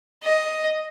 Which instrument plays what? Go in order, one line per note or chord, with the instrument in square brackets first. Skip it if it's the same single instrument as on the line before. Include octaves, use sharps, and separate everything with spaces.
[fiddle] D#5